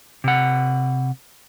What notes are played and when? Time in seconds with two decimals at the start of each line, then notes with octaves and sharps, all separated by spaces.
0.24 C3 F#5